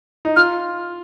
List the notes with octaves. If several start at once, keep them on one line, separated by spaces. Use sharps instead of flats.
D#4
F4 F6